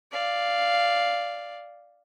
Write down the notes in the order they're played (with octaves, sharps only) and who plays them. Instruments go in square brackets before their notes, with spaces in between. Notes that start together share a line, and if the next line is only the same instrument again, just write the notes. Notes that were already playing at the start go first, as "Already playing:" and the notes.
[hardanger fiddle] D5 F5